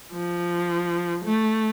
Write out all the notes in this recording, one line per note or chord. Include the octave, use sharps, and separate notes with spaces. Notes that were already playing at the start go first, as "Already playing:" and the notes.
F3
A3